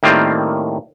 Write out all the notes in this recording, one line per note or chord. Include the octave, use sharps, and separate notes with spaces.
A2 D#3 G3 A#3 C4 F4